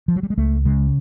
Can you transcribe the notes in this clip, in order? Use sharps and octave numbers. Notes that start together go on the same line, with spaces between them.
F3
F#3
G3
G#3
C#2 A3
C#3 G#3